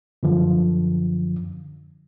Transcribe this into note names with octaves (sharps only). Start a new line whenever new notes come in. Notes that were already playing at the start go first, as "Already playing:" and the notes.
F#2 D3 F3